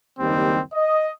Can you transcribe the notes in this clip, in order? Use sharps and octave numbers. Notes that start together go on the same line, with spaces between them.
F#1 D#2 D#3 G3 C4
D#5